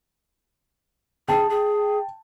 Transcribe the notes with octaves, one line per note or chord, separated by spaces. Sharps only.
G#4 G5 A5
G#4